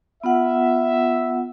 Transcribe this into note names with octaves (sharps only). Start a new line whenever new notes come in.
B3 F4 E5 F#5